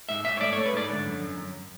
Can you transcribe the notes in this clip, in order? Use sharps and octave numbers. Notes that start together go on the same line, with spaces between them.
G#2 E5
G#2 E5
C#5
A3 D5
C#5
A3
B4
G#2 D5
D3
F#2
F#2
F#2